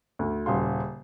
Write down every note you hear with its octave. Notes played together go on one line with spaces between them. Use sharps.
D2
D#1 C#3 F5 C6